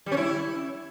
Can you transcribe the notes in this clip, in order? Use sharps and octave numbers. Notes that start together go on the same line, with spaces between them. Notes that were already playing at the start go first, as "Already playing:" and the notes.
G3
C#4
E4